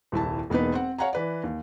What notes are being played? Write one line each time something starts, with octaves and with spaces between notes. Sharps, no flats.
D#1 C2 E4 A5
E1 A#3 B3 D#4 B4
C4 F#5
C#5 F5 F#5 G#5 A#5
E3 B4 D5
D#2